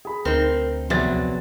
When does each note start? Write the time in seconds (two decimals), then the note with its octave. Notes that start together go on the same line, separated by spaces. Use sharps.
0.05 G#4 B5
0.25 D2 C4 D#4 A#4
0.90 A#1 C3 F#3 B3 G#4 A6